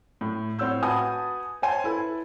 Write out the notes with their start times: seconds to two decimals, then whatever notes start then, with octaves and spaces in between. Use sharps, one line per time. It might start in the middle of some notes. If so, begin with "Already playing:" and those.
0.21 A2
0.59 A2 C4 C#5 F#5 E6 G6
0.83 F#4 B4 G#5 A5 B5 D#6
1.62 C5 C#5 G#5 A5 C6
1.84 E4 A4 B4